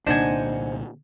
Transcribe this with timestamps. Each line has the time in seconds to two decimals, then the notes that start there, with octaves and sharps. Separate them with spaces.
0.07 C2 A#2 D3 D4 D#4 C5 F#5 G#5